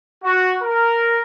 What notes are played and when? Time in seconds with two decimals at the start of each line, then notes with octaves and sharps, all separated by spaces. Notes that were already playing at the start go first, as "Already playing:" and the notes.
0.23 F#4
0.62 A#4